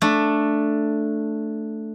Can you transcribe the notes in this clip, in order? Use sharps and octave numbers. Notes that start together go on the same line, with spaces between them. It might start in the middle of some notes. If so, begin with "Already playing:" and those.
A3 D4